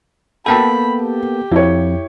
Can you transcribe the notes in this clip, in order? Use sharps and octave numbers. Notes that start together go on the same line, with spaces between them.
A#3 B3 A4 G5 A5 B5
G4
F2 E4 C#5